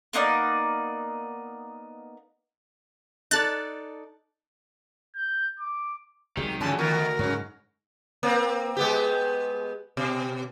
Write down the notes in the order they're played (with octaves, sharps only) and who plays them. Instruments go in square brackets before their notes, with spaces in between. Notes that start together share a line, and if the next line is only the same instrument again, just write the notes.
[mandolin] A#3 B3 D#4 D5
[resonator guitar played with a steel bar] D#4 A4 D5 [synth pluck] F#6 A6
[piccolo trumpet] G6
D6
[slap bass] C2 F#3 G#3 [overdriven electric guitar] D#3 [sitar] G4
[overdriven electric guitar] D2 [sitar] G2 C#3 E3 [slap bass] F3 [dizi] A5
[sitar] D#3 B3 [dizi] A#4
[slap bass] G#2 [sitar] C#3 F#3
[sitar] A#3 C4
G#3 B3 G4
B2